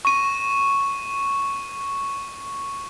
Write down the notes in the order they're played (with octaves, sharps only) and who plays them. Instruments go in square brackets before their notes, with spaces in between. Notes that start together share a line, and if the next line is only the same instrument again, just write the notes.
[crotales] C#6 D#7